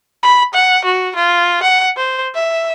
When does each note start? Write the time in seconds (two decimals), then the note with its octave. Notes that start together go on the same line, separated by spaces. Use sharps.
0.23 B5
0.54 F#5
0.84 F#4
1.15 F4
1.63 F#5
1.97 C5
2.35 E5